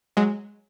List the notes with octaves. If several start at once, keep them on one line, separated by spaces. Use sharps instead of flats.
F#3 G#3